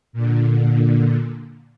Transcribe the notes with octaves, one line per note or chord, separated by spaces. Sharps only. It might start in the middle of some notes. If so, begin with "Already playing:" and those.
A#2 D3